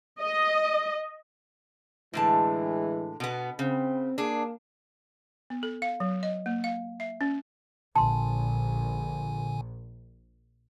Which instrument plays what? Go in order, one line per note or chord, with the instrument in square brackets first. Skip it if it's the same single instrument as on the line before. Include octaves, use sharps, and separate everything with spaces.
[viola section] D#5
[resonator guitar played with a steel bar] A2 D3 A5 [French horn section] E3 G#3
[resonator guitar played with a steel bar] B2 B3
[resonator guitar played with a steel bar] C#3 [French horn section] C4
[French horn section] A#3 [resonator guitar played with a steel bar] D4 G#4
[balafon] B3
A4
F5
F#3
D#5
A#3
F5
E5
C#4
[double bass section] A#1 [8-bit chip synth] A#2 D3 G#5 [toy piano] A5 C6